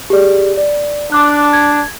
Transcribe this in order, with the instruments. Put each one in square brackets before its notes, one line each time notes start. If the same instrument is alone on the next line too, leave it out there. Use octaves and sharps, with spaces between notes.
[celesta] G4 G#4 D5
D5
[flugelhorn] D4 [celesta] A5 D6 F#6
[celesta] G#6